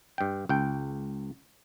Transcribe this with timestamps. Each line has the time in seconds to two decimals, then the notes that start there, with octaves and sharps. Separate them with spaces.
0.18 G2 G5
0.49 C#2 G5